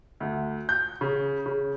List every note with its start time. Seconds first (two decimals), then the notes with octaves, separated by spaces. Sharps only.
0.20 D2
0.69 G6
1.01 C#3
1.46 C#3